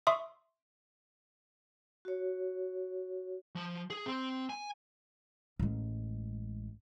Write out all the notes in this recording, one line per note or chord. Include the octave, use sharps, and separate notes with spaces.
E5 C6 C#6 D#6
F#4 C#5
F3
G#4
C4
G#5
A1 G#3